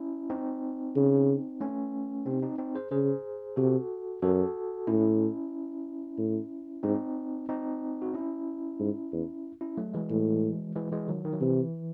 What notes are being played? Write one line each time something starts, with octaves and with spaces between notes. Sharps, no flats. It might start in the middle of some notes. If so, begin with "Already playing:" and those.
Already playing: C#4 E4
C4 D#4
C#3
A3 C#4
C3 C4 D#4
C4 D#4
C4 D#4
G#4 C5
C#3 G#4 C5
C3 F#4 A4
F#2 F#4 A4
A2 C#4 E4
A2
G#2 C4 D#4
C4 D#4
F#4
C#4 E4
G#2
E2
C#4 E4
F#3 A3
E3 G#3
A2
E3 G#3
E3 G#3
D#3 F#3
D#3
F#3
C3 E3